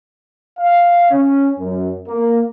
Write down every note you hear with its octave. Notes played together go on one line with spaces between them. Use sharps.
F5
C#4
F#2
A#3